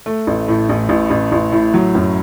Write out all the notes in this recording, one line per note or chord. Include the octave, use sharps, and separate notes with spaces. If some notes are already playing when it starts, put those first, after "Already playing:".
A3
A1
A2
A1
A1
A1
A1
A2
F#3
F#2